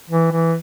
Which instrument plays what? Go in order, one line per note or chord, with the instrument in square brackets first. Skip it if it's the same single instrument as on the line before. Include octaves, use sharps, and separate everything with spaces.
[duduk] E3
E3